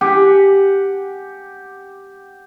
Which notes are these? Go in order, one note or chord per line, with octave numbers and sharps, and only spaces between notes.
G4 F#5 G#5